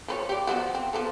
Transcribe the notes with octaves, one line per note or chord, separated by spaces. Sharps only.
F3 B4 C#5
G4 D5
F3 B3 F#4
C4
F3 B3 A4